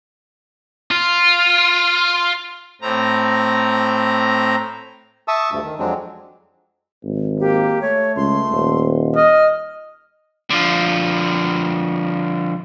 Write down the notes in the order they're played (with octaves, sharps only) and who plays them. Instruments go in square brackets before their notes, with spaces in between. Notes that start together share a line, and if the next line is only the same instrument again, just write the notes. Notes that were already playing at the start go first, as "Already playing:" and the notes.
[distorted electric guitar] F4
[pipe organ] A2 C4 A#5
[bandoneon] E5 A5 C#6 D#6 E6
D2 G2
D#3
F2 F#3 G#3 C4 D4
[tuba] G#1
[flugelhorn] A#3 [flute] G4
[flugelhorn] A3 [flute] C#5
[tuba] C#2 [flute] C6
[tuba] D#1
[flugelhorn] D#5 [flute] F6
[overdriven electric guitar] D3 F3